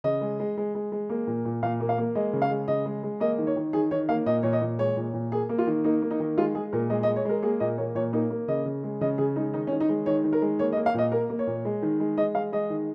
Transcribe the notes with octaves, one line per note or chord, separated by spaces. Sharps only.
C#3 D#5
G#3
G#3
G#3
G#3
G#3
A#3
A#2
A#2
A#2 F5
A#3
F5
A#3
G#3 D#5
C#3
F5
G#3
C#3 D#5
G#3
G#3
A#3 D#5
D#3
C#5
D#3
D#3 G#4
D#3 C#5
A#3 F5
A#2 D#5
A#2 C#5
D#5
A#2
G#3 C#5
A#2
A#2
A#3 G#4
A#3
F4
D#3
A#3 D#4
A#3
D#4
D#3
G#3 F4
G#3 G#4
A#2 A#4
G#3 D#5
D#5
G#3
C#5
G#3 A#4
A#3 G#4
A#2 D#5
A#3 C#5
A#2 C#5
A#3 D#4
A#3
C#3 D#5
C#3
G#3
C#3 D#5
C#3 G#4
G#3 D#4
D#3 D#4
C#4
D#3
D#4
G#3
D#3 C#5
D#3
A#4
G#3
A#3 C#5
D#5
A#3
F5
A#2 D#5
A#3 A#4
A#3
C#5
A#2
G#3
D#3
G#3
G#3 D#5
G#3 F5
G#3 D#5
D#3